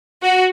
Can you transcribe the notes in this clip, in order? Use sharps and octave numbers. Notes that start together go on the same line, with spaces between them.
F#4